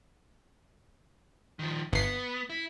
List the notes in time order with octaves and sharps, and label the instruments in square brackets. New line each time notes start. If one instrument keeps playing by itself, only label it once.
[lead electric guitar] D#3 F3
[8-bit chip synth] G1 C7 [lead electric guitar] B3
[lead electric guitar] E4